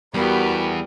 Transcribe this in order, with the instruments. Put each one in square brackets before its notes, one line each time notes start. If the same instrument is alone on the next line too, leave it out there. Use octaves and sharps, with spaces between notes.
[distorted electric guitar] E2 [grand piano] G3 [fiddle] B3 G4 [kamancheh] F#4 A#4